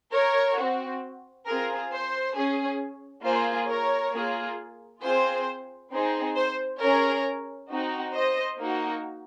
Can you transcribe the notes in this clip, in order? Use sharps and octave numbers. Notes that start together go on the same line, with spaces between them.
A#4 C#5
C4 F#4
C4 F4 G#4 A#4
C5
C#4 G#4
A#3 F4 G#4 C5
A#4 C#5
A#3 F4 G#4
C4 F4 G#4 C5
C4 D#4 G#4
C5
C#4 G#4 A#4 C#5
C4 D#4 F#4
C5 D#5
A#3 D#4 F#4